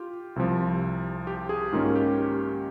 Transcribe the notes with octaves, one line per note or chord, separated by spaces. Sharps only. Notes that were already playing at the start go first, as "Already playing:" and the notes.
Already playing: F4 G4
C2 C3 F3
G4
G#4
G#2 D#3 A#3 C#4 F4
G4